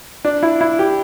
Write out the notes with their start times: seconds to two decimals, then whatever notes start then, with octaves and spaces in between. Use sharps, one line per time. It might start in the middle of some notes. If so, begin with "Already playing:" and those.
0.25 D4
0.43 E4
0.61 E4
0.79 G4